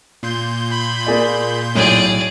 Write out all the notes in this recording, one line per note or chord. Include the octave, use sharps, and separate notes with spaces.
A#2 C6 G6
B5
A#3 G#4 D5
B1 A2 G#4 D5